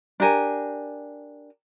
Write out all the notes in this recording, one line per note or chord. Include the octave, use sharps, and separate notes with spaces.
D4 G4 A#4 G#5